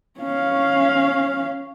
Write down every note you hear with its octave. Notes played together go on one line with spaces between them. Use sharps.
C#4 F5